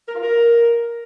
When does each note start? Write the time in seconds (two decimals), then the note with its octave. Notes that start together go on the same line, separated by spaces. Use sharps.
0.08 A#4
0.15 F4
0.22 A#4